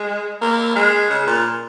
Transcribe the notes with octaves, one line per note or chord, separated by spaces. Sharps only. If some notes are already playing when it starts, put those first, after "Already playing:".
Already playing: G#3
A#3
G#3
C#3
A#2